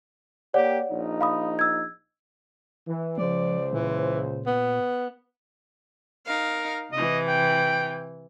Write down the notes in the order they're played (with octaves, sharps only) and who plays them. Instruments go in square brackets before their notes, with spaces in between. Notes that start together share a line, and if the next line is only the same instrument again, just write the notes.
[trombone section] A#3 G4 [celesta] C#5 D5 F#5
[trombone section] A#1 D#4
[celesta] F5 B5 D#6
E6 G#6
[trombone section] E3
[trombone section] C#2 C#3 C5 [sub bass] F3 [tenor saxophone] D5
[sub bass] A#2 [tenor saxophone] E3
[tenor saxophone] B3
[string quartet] D#4 F5 [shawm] A#4
[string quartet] C3 E3 [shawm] D#5
[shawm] G5